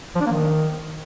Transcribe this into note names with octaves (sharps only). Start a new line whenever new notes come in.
F3
D4
A#3
D#3